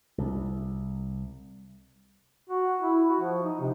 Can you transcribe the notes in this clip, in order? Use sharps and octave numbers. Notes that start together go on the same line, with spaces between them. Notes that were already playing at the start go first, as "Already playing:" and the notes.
C2
F#4
E4
F#4
F3
D#4
C3